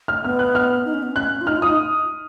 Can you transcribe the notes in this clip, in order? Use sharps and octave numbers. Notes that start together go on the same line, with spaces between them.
F6
B3 F6
F#6
F6
D#4
C#4
B3
C#4 F#6
F4
D#4 F6
F4
D#4 D#6